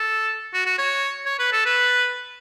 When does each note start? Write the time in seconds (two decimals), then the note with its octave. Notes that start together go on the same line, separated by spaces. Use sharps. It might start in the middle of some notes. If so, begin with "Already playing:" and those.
Already playing: A4
0.54 F#4
0.66 F#4
0.78 C#5
1.26 C#5
1.39 B4
1.52 A4
1.66 B4